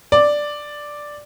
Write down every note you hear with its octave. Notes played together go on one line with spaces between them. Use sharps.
D5